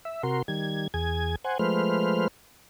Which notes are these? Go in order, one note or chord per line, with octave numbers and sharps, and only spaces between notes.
E5
C3 F#4 A#4 C6
D#3 G3 G#6
E2 G#4 G#6
C5 F#5 G#5
F3 G#3 A3 B4 C5 F6